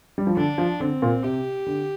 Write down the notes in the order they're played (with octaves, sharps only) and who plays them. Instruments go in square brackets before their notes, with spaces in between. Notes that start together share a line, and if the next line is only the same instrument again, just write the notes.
[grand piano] G3
F3
[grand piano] D3 [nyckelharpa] D4
[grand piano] F3
[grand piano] D3 [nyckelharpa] C4
[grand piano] A#2
[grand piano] C3 [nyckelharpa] G4
[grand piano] D3